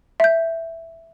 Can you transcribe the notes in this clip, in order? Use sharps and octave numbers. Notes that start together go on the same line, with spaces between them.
E5 G6